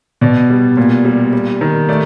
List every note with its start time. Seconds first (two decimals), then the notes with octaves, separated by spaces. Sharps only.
0.21 B2 D5
0.50 G3
0.77 A#2
1.05 G3
1.33 G3
1.61 D#3
1.89 A3 D5